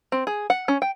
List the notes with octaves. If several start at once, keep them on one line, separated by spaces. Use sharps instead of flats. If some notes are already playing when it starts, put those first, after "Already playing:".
C4
G#4
F#5
C#4
G5